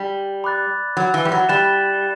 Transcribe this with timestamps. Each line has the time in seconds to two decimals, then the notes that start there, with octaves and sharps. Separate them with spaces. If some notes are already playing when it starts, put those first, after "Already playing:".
Already playing: G3
0.44 B5 D6 F#6 A6
0.97 F#3
1.14 E3
1.25 G3
1.32 F#3
1.49 G3 F#6 A6 E7